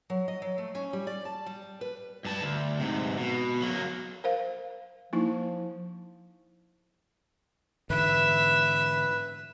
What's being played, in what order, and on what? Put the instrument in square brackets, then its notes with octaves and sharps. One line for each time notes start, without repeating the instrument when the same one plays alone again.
[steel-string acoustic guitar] F#3
D#5
F#3
A3
C#4
G3
D5
A5
G3
B4
[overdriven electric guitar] G2 A5
D2
G#2 C3
B2
F#3 A#3
[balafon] A#4 C5 F5
[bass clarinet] F3 [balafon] A#3 D#4 E4
[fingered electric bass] G#2 D3 E3 [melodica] B4 [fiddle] E5